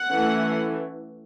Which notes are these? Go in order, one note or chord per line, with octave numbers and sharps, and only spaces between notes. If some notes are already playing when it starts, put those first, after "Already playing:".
Already playing: F#5
E3 A3 C#4